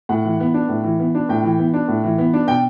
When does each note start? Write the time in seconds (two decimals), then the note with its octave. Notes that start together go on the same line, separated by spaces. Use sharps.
0.09 A2 F#5
0.25 E3
0.40 B3
0.54 D4
0.69 A2
0.84 E3
0.99 B3
1.15 D4
1.29 A2 G5
1.43 E3
1.59 B3
1.74 D4
1.88 A2
2.04 E3
2.18 B3
2.33 D4
2.48 B2 G5